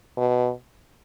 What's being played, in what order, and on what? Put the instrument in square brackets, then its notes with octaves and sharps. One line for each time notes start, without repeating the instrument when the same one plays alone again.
[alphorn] B2